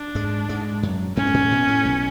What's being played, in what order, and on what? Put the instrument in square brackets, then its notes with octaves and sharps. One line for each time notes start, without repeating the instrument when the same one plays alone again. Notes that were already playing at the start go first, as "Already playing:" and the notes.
Already playing: [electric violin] D4
[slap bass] G#2 G#3
G#2 G#3
F#2 F#3
[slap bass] G#2 G#3 [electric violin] C#4
[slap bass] B3
A2 A3
B2 B3
A2 A3
B1 B2